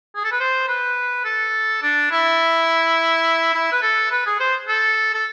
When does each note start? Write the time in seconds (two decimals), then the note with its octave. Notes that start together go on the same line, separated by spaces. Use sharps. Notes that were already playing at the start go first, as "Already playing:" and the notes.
0.16 G#4
0.24 A4
0.32 B4
0.40 C5
0.68 B4
1.25 A4
1.83 D4
2.12 E4
3.54 E4
3.72 B4
3.83 A4
4.11 B4
4.26 G#4
4.40 C5
4.69 A4
5.14 A4